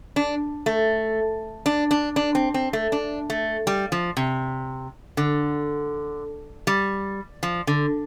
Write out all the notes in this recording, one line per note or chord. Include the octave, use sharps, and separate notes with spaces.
D4
A3
D4
D4
D4
C4
C4
A3
D4
A3
G3
F3
C3
D3
G3
F3
D3